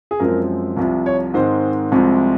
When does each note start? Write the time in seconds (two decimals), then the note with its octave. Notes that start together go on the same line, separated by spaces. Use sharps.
0.11 G#4
0.20 F#2 F3 G#3 C4 A#4
0.77 C2 C3 F3
1.06 C#5
1.34 G#2 D#3 G#3 C4 C5
1.92 C2 C3 F3 G#3 C4